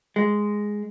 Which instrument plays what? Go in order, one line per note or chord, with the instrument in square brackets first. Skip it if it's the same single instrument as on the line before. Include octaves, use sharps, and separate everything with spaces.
[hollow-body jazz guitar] G#3